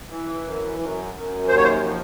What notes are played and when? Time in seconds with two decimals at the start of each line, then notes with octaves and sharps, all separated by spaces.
0.09 E3
0.43 F#2
0.79 F#2
1.14 F#2
1.48 D#2 C5
1.57 C#5
1.64 C5
1.84 F3